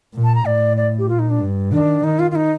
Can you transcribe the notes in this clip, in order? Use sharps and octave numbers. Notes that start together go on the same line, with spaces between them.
A#2
A5
A#5
A2 D5
D5
G4
A#2 F4
D#4
D4
G2
D#3 D4
D#3 D#4
F4
F4
D#4